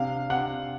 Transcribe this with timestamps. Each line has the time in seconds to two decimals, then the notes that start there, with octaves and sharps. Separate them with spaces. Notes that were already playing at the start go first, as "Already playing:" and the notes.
Already playing: C3 D4 F5
0.30 C3 F#5